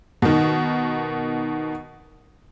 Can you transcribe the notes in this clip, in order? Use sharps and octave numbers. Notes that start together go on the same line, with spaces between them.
B2 D#3